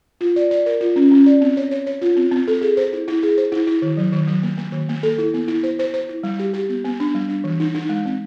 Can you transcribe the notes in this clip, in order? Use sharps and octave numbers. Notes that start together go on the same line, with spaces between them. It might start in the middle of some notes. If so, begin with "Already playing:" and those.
F4
D5
D5
A#4
F4
C#4
C#4
D5
C4
C#5
C#5
C#5
F4
C4
C4
A4
G#4
C5
E4
E4
G#4
C5
E4
E4
D#3
F#3
D#3
F#3
A#3
A#3
D#3
A#3
A4
E4
B3
E4
C5
C5
C5
E4
G3
G4
G4
B3
B3
D4
G3
D4
E3
D#4
D#4
G#3
C4